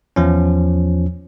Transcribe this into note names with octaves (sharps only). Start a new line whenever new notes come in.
E2 F3 C#4